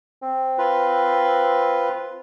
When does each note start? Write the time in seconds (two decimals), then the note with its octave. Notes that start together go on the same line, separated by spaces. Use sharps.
0.22 C4
0.58 F4 B4